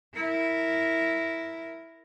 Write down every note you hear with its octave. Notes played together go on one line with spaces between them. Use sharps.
E4 A#4